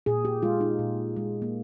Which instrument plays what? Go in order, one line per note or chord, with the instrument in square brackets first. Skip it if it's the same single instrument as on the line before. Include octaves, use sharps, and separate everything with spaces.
[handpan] A#2 G#4
G4
G#3 F4
D#4
A#2
G#3
A#3